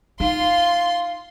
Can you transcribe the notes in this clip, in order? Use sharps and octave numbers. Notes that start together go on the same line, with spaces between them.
D#4 F4 F5 C6